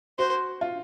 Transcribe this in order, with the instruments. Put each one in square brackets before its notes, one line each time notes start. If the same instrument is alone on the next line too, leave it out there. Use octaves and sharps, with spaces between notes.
[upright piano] F#4 [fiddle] C5
[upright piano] F4